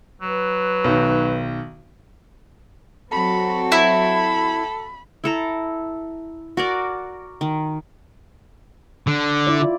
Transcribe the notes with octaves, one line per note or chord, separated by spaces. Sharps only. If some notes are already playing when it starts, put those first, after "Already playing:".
F#3 B4
B1 D#3
F#3 C4 F#4 A4 B5
E4 B5
E4 A4 A#5
F#4 A#4 D5
D#3
D3
E4 D5
F4